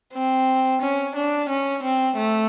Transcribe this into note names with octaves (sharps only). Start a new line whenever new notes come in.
C4
C#4
D4
C#4
C4
A3